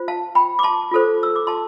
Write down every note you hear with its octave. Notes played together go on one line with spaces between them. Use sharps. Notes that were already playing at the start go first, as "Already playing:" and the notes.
Already playing: F4 C5
F5 A5
G5 B5
D6
A5 C6
F4 A4 C5
E6
D6
A5 C6